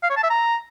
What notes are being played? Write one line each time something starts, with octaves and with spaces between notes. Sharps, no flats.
F5
C#5
A5
E5
A#5